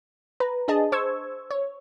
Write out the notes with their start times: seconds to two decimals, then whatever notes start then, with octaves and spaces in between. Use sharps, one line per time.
0.40 B4 A#5
0.68 D4 G#4 D#5 A5
0.92 C5 C#6 E6 G#6
1.51 C#5